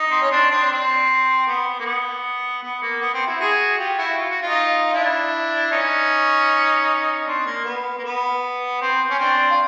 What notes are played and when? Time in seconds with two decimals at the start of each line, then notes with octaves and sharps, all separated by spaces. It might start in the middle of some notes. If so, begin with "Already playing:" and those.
Already playing: D#4
0.11 C4
0.22 C#4
0.31 C4 D4
0.50 C4 D4
0.70 C4
1.47 B3
1.80 A#3
1.85 B3
2.63 B3
2.82 A#3
3.02 B3
3.15 C4
3.27 E4 F#4
3.40 F#4 G#4
3.78 F4 G4
3.98 E4 F#4
4.17 F4
4.30 F#4
4.43 D#4 F4
4.94 D4 E4
5.71 C#4 D#4
7.26 C4 D4
7.45 A#3
7.65 B3
7.98 A#3
8.04 B3
8.81 C4
9.10 C#4
9.19 C4 D4
9.50 F4